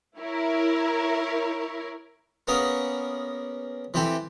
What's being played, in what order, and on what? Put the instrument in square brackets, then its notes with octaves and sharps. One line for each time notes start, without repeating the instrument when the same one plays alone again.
[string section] E4 A#4 C#5
[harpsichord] A#3 B3 C#4 G#4 A#4
E3 C4 G4 A4